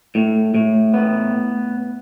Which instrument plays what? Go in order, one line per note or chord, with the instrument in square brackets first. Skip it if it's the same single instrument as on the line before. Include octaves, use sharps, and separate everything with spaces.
[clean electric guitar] A2
A2
B3